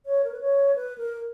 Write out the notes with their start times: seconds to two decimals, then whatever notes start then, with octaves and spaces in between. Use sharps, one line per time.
0.06 C#5
0.24 A#4
0.32 B4
0.41 C#5
0.75 B4
0.98 A#4